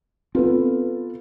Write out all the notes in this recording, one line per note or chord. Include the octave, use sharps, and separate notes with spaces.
B3 C4 F4 A4 B4